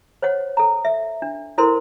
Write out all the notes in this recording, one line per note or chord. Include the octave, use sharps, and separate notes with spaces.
C5 C#5 F#5
A4 A#5
E5
D4
E4 A4 A#4 C5 C6